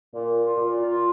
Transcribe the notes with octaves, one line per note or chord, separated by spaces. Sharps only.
A#2
F4
A#2
F4